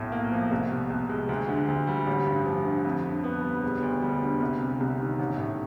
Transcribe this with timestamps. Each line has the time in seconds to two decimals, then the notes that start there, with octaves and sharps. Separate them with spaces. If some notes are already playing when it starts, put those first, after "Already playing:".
Already playing: B1 A2
0.12 A#3
0.31 F3
0.51 C2
0.70 B2
0.90 C2
1.10 G#3
1.29 D2
1.49 D3
1.68 D2
1.87 G3
2.07 A1
2.27 G2
2.46 F3
2.65 D3
2.84 F2
3.04 D3
3.24 B3
3.44 G3
3.63 E1
3.82 D2
4.02 G3
4.21 D3
4.40 C2
4.60 C3
4.80 C2
5.00 D#3
5.19 A1
5.38 A2